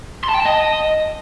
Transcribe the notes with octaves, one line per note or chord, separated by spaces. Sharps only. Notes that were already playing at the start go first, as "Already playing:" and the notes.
C6
A5
G5
A5
D#5